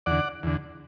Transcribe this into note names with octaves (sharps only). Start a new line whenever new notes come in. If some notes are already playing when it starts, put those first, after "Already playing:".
E2 D3 D5 F#5
E2 D3